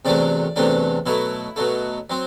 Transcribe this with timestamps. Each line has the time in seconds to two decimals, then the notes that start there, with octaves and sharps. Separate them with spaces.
0.05 E2 C3 F#3 A3 D4 D5
0.56 E2 C3 F#3 A3 D4
1.06 B2 F#3 A3 E4
1.56 B2 F#3 A3
2.10 F#3 C4